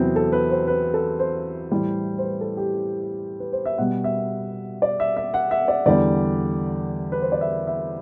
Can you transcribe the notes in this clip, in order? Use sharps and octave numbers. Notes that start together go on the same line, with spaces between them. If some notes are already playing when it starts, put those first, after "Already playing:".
Already playing: E2 C3 F#3 B3 C4
A4
B4
C5
B4
A4
C5
A2 E3 G3
C5
B4
A4
G4
B4
C5
E5
B2 G3 F#5
E5
D5
E5
E5
F#5
E5
D5
E2 D3 G3 D5
B4
C5
D5
E5
E5